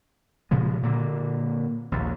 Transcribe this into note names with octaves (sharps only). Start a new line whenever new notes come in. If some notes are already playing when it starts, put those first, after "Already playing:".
A#2 C#3 F3 G#3
A#2 D3 A#3
A#1 D#2